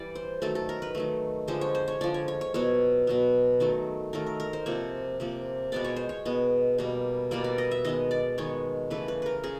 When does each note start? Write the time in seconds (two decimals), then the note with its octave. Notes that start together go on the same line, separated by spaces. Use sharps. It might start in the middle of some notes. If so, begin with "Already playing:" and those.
Already playing: E3 G3 D5
0.15 C5
0.42 D#3 F#3 A3 A4
0.55 A4
0.69 A#4
0.82 B4
0.95 D#3 F#3 A3
1.48 D3 F3 G#3 C5
1.61 C#5
1.75 C5
1.88 C#5
2.01 D3 F3 G#3 D5
2.14 C#5
2.28 C#5
2.41 C#5
2.54 B2 F#3 B3 C#5
3.07 B2 F#3 B3
3.60 D#3 F#3 A3
4.13 D#3 F#3 A3 A#4
4.26 A#4
4.40 A#4
4.53 C5
4.66 C3 F3 A#3 C#5
5.20 C3 F3 A#3
5.72 B2 G#3 B3 D5
5.84 C#5
5.96 C5
6.09 C#5
6.26 B2 G#3 B3
6.78 B2 G3 A#3
7.31 B2 G3 A#3 D5
7.44 D5
7.58 D#5
7.71 E5
7.85 D#3 G#3 B3 D#5
8.11 D5
8.38 D#3 G#3 B3 C#5
8.90 C#3 E3 A3 B4
9.08 B4
9.22 A#4 B4
9.44 C#3 G#4